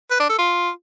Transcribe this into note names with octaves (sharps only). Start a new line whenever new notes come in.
B4
D4
A4
F4